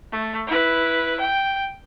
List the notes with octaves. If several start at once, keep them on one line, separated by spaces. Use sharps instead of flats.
A3
E4 B4
G5